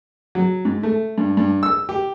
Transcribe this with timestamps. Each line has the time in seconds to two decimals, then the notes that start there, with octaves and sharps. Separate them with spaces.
0.35 F#3
0.65 G#2
0.83 A3
1.18 G2
1.37 G2
1.63 E6
1.89 G4